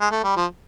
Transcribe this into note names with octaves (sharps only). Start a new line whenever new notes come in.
G#3
A3
G3
F3